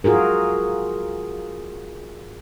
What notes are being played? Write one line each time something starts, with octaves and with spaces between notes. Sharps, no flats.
F4 F#4 G#4 A#4